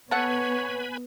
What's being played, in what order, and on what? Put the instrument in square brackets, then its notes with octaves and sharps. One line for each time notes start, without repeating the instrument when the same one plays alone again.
[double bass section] B3 [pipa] A4 F#5 [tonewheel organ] B4 G#5 B5 [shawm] C#5